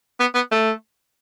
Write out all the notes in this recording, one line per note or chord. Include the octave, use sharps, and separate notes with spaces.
B3
B3
A3